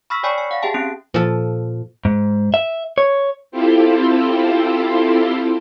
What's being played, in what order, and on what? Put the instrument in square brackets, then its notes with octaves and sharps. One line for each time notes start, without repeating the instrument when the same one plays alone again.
[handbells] B5 C#6 E6 F6 A#6 B6
C#5 D5 G5 G#5 B5 C#6
G#5
F5 F#5
G4 G#4 E5 G5 A5
C4 C#4 G4 D7
[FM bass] A#2 [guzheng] F3 A4
[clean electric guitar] G#2
E5
C#5
[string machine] C4 E4 F4 G4 A4 C5